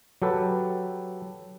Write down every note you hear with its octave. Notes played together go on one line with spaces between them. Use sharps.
F#3 G4 A4 B4